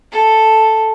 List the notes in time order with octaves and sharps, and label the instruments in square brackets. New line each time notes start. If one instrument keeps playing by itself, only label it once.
[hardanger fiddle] A4